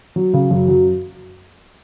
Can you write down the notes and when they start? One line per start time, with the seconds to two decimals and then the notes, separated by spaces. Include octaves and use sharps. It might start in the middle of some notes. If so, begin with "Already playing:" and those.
0.16 F#3
0.34 C#3
0.51 F#2
0.68 F#3